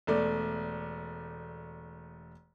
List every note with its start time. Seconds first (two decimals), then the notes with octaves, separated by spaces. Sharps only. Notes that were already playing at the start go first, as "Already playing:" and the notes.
0.07 E1 A3 D5